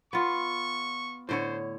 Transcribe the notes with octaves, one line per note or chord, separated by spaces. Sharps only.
B3 F4 C#6
A2 D3 C5 C#5